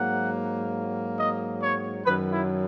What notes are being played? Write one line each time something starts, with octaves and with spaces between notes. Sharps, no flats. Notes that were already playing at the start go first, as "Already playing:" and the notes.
Already playing: G#2 F#3 A#3 F#5
D#5
C#5
F#2 D#3 F#3 B4
E4